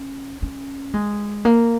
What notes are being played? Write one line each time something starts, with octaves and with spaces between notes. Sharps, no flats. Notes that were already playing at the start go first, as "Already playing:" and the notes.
Already playing: C#4
C#4
G#3
A#3